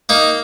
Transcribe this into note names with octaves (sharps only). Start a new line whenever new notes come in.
A#3 D#4